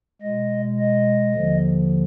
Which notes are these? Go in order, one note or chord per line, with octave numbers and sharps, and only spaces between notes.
B2 G#3 D#5
D#5
D#2 D3 F3